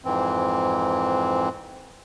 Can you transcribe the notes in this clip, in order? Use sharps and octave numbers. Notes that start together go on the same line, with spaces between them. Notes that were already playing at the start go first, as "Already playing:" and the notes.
F2 G#2 E3 C4